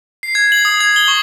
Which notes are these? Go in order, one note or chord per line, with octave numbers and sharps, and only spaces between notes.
C7
G#6
F#7
D#6
G#6
G7
C#6